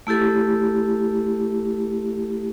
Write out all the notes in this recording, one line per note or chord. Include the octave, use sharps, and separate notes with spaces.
A3 E4 G4 A4